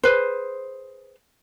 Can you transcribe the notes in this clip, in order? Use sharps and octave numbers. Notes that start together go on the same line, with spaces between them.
G#4 B4 C5